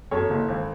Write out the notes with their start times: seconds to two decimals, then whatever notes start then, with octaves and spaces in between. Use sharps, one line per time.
0.11 F#2 A4 C#5
0.30 F#1
0.49 G#1